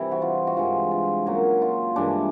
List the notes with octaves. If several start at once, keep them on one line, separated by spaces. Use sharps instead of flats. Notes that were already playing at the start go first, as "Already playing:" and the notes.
Already playing: C3 E3 G3 E4
F#4
F4
F#4
G2 E3 G#3 F4
F4
C#3 F#3 A#3 F#4
F4
G2 E3 G#3 D4